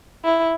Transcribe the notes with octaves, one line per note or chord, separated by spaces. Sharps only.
E4